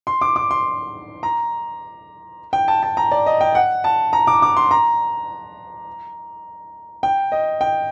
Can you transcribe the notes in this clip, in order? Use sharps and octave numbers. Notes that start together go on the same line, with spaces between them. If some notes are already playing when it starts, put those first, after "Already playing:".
C6
D6
D6
C6
A#5
G5
A5
A5
A#5
D5
D#5
G5
F#5
A5
A#5
D6
D6
C6
A#5
G5
D#5
G5